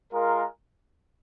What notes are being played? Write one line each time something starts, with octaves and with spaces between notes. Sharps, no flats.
G#3 F4 A#4